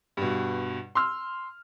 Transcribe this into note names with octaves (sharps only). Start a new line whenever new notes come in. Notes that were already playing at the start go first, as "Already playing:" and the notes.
G2 B2
C6 E6 F6